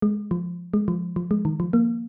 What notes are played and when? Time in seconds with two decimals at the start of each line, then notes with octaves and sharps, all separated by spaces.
0.02 G#3
0.31 F3
0.74 G#3
0.88 F3
1.16 F3
1.31 G#3
1.45 D#3
1.60 F3
1.73 A#3